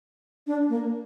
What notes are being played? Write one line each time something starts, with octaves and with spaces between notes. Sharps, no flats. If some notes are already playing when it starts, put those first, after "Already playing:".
D4
A#3